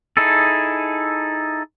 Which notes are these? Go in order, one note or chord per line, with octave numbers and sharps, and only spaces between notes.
D#4 E4 G#4 A4